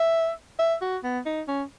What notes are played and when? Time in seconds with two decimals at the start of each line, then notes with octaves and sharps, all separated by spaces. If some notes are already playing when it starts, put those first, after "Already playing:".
Already playing: E5
0.59 E5
0.81 F#4
1.04 B3
1.26 D#4
1.48 C#4